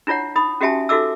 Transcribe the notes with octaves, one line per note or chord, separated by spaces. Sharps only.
D4 E4 F4 C#5 F#5
D#4 B5 D#6
C#4 F#4 G4 E5 G#5 A5
D#4 F#4 A4 E5 D6 E6